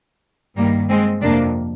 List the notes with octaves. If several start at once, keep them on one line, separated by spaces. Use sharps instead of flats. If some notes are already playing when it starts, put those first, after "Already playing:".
G2 D#3 G3 A#3
G#3 C4
F2 C3 F3 A#3 D4